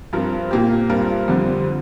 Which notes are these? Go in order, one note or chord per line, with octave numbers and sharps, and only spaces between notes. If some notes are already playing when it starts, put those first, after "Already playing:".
G2 F3 C4 A#4
A#2 A#3 G4
G2 G3 C4 F4 A#4
F2 D3 G3 C4